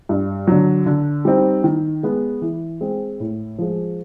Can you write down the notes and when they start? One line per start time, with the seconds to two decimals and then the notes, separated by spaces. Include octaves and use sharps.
0.09 G2
0.47 D3 F#3
0.86 D3
1.25 G3 C4 D#4
1.64 D#3
2.03 G#3 B3
2.42 E3
2.81 G#3 C4
3.20 A2
3.59 F3 G#3